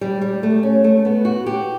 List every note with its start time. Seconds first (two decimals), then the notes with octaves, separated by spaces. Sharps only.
0.01 G3
0.21 G3
0.43 A3
0.63 C#4
0.84 A3
1.05 B3
1.25 F#4
1.46 G4